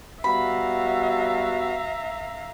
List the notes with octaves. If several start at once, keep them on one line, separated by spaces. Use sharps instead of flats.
G3 B3 F#4 E5 F5 A#5 B5